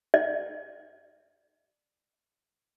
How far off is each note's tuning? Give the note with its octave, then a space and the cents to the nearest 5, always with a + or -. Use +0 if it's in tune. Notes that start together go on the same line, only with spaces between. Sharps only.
D5 +15